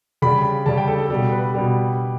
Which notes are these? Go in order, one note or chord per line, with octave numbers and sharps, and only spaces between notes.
C#3 G3 B5
C#3 G3 A5
G5
A4
A4
B2 G3
B4
B2 G3